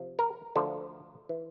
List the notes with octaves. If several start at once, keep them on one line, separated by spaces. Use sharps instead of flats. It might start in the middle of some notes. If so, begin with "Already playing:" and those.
Already playing: C3 F3
A#4
D2 D3 F3 A4
E3